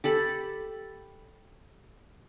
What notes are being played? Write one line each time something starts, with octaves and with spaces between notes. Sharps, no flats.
G4 A4 B5